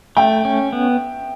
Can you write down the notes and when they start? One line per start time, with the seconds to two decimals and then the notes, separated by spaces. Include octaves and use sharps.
0.17 A3 E5 G5
0.45 C#4
0.73 B3